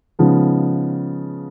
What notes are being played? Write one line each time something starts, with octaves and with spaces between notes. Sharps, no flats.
C#3 F3 G#3 B3 D#4